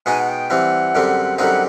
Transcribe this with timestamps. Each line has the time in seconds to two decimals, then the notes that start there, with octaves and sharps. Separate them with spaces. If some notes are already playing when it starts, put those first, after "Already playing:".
0.06 B2 G#3 B3 D#4 G#5
0.20 F#5
0.29 G5
0.50 E3 G3 C4 F#5
0.95 F#2 D3 G3 C4
1.38 F#2 D3 G3 C4 D#4 F#5